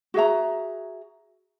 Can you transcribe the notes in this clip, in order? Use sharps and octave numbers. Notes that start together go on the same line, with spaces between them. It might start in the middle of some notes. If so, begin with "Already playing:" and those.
F#4 G#4 E5 A#5